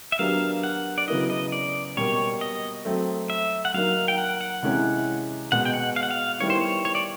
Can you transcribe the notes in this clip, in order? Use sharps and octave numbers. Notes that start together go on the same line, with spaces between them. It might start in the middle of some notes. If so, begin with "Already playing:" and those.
E5
F#3 B3 D4 G4 A#4 F5
F#5
D5
C#3 F#3 B3 E4 D#5
D#5
D5
B2 G3 A#3 C#5
D#5
F#3 A3 C4
E5
F#5
F#3 A#3 D#4 F5
G5
F#5
F#5
C3 E3 G#3 C#4 E4
B2 G#3 B3 F#5
G5
F#5
F5
F#5
F5
D#3 G3 B3 E4 C#5
C5
C#5
C#5
D5